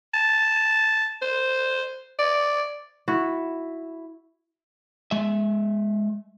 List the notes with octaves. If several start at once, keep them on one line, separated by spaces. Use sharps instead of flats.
A5
C5
D5
E4 F#4
G#3 E5